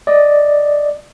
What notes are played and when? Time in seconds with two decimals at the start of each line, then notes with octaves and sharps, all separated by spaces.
0.07 D5 D#5